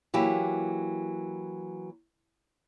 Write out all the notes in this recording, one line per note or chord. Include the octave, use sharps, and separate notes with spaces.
E3 F#3 A#3 G4